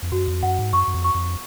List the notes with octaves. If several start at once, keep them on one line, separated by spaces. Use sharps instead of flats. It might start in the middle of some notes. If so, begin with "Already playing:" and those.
F2
F#2 F#4
F2
F#2 F#5
G#2
F#2 C#6
F#2
F2
C#6
F2